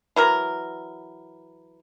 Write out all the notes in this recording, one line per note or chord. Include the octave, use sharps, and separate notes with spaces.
E3 F#3 A#4